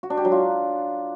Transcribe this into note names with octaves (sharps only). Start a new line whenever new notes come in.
F#4
D4
G4
F#3
F4